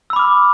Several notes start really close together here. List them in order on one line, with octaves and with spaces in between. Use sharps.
E6 B5 D6 F6